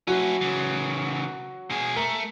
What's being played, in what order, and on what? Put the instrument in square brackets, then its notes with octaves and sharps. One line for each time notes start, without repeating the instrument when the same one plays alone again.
[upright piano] F#3 F#4 [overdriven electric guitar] C#4 E4
[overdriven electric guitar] C#3 E3
B2 G#4
[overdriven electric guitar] A3 [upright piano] A#4